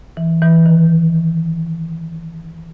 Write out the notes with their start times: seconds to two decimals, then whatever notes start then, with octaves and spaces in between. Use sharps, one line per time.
0.17 E3
0.42 E3
0.66 D#3